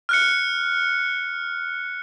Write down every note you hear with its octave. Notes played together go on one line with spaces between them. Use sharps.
F6 F#6 C#7